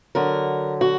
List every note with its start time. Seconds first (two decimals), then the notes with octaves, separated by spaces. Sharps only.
0.15 D3 F#3 A#4
0.81 F#4